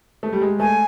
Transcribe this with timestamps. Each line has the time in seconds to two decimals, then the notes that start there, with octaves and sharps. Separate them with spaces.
0.23 A3
0.33 G3
0.41 G#3
0.60 A3 G#5